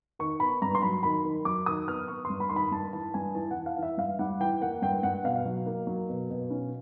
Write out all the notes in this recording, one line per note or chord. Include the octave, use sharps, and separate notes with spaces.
D#3 C#6
B3 B5
G2 A#5
C6
F#3 B5
D#3 B5
D#3
F#3 D6
D#3 D#6
B3 F6
B3 C#6
C6
G2
B5
D#3 C6
B5
G2 A5
E3 A5
G2 G#5
E3 A5
F#5
E3
F5
E3
E5
G2 F5
G3 F#5
E3 G5
A#3 F#5
G2 G5
G2 F#5
B2 F5
F#3
A#3
F#3
B2
B2
C#4